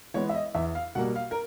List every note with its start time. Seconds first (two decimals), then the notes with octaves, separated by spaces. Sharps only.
0.14 E3 G#3 B3 C#5
0.29 E5
0.35 D#5
0.55 E2 E5
0.75 F5
0.95 B2 G3 A#3 F#5
1.16 F5
1.31 A#4